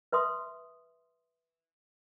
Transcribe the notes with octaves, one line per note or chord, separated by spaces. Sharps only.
B4 E5 C6 D#6